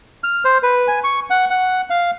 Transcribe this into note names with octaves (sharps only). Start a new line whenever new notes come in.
F6
C5
B4
G#5
C#6
F#5
F#5
F5